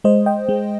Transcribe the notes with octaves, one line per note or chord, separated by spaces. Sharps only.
G#3 C5 D#5
D#5 G5
G#3